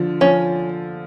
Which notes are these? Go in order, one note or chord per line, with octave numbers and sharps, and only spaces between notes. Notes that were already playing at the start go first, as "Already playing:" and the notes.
Already playing: D3 F3
F3 C#4